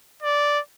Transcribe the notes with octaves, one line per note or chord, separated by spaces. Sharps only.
D5